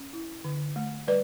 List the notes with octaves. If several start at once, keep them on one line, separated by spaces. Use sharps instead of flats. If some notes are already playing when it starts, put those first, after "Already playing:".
Already playing: C#4
E4
D3
A3
G3 B4 D5